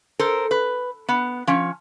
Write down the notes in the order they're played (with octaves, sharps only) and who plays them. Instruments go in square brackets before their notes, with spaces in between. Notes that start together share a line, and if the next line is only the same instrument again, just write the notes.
[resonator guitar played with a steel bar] A4 A#4 C5
B4
B3
F3 C#4